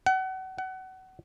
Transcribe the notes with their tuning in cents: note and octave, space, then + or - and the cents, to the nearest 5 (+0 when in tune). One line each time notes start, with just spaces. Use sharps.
F#5 +30
F#5 +25